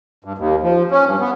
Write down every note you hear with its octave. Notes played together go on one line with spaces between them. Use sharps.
G2
D#2
F3
C#4
G2
B3